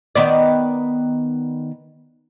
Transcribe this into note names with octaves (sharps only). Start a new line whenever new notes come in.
D#3 B3 D5